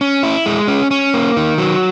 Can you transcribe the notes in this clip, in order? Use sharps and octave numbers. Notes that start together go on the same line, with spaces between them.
C#4
E4
G#3
C#4
C#4
A#3
D#3
F#3